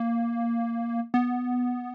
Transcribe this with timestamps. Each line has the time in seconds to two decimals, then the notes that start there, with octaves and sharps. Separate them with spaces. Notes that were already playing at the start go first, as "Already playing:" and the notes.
Already playing: A#3
1.14 B3